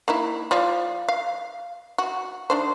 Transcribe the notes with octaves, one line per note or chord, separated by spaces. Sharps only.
A#3 D#4 E4
F3 F4 D5
F5
F#4
D#3 D4 C5